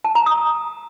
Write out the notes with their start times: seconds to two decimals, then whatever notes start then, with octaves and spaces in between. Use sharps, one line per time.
0.04 A5
0.15 A#5
0.26 D#6